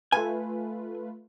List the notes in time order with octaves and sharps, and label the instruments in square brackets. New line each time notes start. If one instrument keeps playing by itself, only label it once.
[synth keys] A3 F4 B4 [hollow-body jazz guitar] G#5